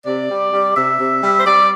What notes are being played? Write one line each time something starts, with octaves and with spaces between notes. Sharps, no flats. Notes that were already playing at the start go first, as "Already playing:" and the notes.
C3 D5
G3
G3
C3 E5
C3
G3
C5
G3 D5